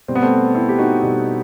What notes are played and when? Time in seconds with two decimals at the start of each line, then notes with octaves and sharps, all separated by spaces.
0.08 B2 G3 C4
0.15 B3
0.22 A3 C4
0.55 C4 E4
0.69 G4
0.78 D#4 F#4
1.02 B2 G3